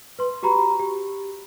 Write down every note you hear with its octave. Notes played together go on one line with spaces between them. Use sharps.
B4 C6
F#4 G4 A#5 B5
G4